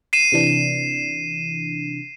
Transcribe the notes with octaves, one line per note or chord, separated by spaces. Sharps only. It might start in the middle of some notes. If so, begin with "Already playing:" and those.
C7 D#7 E7
C3 E3 D4